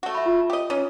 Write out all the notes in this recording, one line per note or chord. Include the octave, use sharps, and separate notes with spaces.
A3 F#4
E5 B5
F4
G4 D#5
E3 C#4 D#4